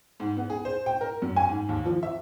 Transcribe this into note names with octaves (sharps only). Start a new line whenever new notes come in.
G#2
B3
G#4
C5
G5
A#4
F#2
G#5
G#2
D#2
F3
E5